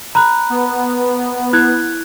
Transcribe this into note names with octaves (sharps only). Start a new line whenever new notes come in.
A#5 B5 F#6
B3
E4 F#6 G#6